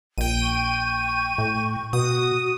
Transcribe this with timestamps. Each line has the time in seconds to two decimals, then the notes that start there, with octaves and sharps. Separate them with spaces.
0.18 A#1 G5 D#7
0.42 C#6
1.38 A2
1.93 B2 F#4 D#6